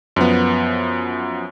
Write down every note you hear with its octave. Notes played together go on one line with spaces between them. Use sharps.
F#2 F3 B3